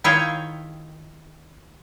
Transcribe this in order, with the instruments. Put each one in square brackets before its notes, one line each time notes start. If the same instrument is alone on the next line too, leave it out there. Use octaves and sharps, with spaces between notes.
[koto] D#3 E4 F4 G#4 C#5 G5